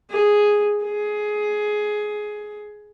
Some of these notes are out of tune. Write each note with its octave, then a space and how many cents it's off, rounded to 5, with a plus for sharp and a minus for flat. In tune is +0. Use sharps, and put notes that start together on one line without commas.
G#4 +0
G#4 +15